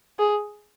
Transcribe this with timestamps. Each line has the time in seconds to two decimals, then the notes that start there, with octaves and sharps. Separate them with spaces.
0.19 G#4